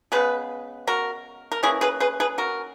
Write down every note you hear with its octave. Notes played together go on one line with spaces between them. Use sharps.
C#3 G#3 B3 G#4 B4
F#4 A#4
A#4
E3 A#3 C#4 E4 G#4
G#4 B4
G#4 B4
G#4 B4
F#4 A#4